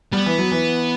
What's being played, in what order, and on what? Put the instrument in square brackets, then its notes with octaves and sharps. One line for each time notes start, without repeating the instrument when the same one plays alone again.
[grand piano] G3 [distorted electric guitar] B3
[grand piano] E3
F#3
E3